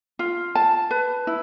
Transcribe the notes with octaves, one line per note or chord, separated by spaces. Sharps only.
F4
A5
B4
E4